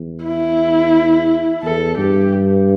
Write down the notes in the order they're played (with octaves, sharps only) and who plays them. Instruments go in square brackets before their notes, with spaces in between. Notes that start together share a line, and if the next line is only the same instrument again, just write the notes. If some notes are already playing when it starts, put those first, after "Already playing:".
Already playing: [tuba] E2
[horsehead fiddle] E4
[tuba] E2 [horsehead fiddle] A4
[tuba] G2 [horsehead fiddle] G4